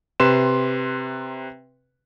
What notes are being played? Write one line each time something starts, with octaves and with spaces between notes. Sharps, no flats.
C3 B4 C6 E7